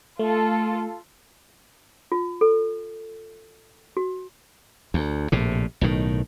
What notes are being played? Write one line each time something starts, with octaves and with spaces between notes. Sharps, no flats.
A3 F4 A4
F4
A4
F#4
D2
A#1 A2 C3
B1 A2 D#3